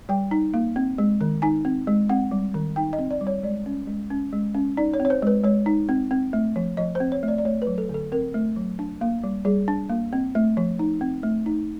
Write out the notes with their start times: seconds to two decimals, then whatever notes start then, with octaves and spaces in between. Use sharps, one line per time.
0.09 G3 G5
0.31 D#4
0.54 A#3
0.76 C4
0.98 G#3
1.21 D#3
1.42 D#4 G#5
1.65 C4
1.87 G#3
2.09 C4 F#5
2.31 G3
2.54 D#3
2.76 D#4 G5
2.93 D#5
2.99 C4
3.11 D5
3.21 G3
3.27 C#5
3.43 G#3 D5
3.66 C#4
3.87 G#3
4.10 C#4
4.33 G#3
4.55 C#4
4.77 D#4 D5
4.94 C#5
5.00 C4
5.05 C#5
5.10 C5
5.22 G#3 B4
5.44 G#3 C#5
5.66 D#4
5.89 C4
6.11 C4
6.33 A3
6.56 F3
6.77 F3 D#5
6.95 C5
7.00 C4
7.12 C#5
7.23 A3
7.28 D5
7.38 D5
7.45 A3 C#5
7.62 B4
7.67 F#3
7.78 A4
7.89 D3
7.94 A4
8.12 C4 A#4
8.34 A3
8.56 F#3
8.79 D4
9.01 A#3
9.24 G3
9.45 G3 G#4
9.68 D4
9.89 A#3
10.13 C4
10.35 A3
10.57 F3
10.79 D#4
11.01 C4
11.23 A3
11.46 D#4